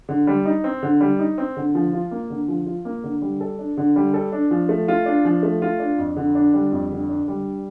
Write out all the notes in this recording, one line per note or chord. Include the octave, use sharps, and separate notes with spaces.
D3
G3
D#4
C4
D3
G3
D#4
C4
D3
F3
F4
A#3
D3
F3
F4
A#3
D3
G3
A4
D4
D3
G3
A4
D4
F3
A3
F4
D4
F3
A3
F4
D4
F2
D3
D4
G3
F2
D3
D4
G3